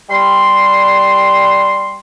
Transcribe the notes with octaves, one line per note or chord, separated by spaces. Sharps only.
G3 C6